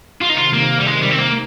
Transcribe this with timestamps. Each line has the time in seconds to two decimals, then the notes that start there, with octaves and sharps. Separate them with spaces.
0.21 C3 D#3 F4
0.29 D#4
0.37 F4
0.53 A#3
0.80 G3
0.86 G#3
1.02 G3
1.11 C4
1.19 A#3